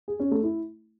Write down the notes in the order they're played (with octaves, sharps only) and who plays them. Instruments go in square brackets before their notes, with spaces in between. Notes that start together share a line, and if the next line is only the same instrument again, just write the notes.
[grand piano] G#4
C#4
A3
E4